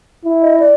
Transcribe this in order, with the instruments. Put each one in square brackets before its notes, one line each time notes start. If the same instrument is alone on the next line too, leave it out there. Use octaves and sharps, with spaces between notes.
[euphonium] E4
[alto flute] D#5
D5